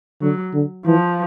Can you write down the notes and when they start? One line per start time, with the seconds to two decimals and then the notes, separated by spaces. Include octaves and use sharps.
0.22 D3 F#3
0.54 D3
0.86 E3 F3